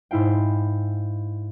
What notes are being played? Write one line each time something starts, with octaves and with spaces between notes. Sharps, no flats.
G#2 E4 F5 G5